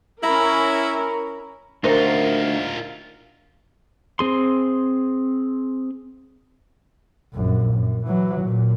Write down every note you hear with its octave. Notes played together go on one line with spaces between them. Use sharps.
C#4 E4 A#4 A#5 B5
D2 D#4 F4 A#4 C5
C4 G#4 C6
A#1 F#2
F#2
E3 F#3
A#2